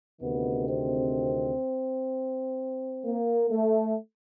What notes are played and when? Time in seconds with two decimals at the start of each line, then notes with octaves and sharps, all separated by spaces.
0.20 D2 C3 D#3 B3
0.68 C4
3.04 A#3
3.51 A3